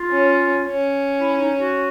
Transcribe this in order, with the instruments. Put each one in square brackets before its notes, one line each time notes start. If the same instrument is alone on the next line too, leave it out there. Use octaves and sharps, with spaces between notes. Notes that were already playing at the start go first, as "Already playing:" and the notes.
Already playing: [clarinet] F4
[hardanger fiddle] C#4
C#4
[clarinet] E4
D#4
F#4